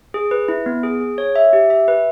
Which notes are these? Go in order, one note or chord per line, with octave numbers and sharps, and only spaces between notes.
G#4
B4
E4
B3
G#4
G#4
C#5
E5
G4
E5
B4